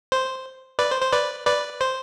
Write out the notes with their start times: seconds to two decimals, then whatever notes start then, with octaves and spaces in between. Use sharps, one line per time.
0.12 C5
0.79 B4 D5
0.91 C5
1.02 C5
1.13 B4 D5
1.47 B4 D5
1.81 C5